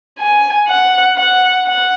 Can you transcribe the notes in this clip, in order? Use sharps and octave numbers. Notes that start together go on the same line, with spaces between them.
G#5
F#5
F#5
F#5